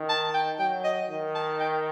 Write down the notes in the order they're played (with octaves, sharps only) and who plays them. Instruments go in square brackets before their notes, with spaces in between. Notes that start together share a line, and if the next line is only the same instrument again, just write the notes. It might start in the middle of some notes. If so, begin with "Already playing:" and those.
Already playing: [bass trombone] D#3
[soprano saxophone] A5
G5
[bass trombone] F#3 [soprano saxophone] G5
[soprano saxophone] D#5
[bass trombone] D#3
[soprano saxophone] A5
G5